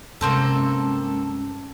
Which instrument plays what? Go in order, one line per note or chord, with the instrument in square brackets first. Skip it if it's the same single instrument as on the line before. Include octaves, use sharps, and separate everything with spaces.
[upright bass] G2 C3 [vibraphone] G#3 C#4 A5 [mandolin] A#3 C4 A4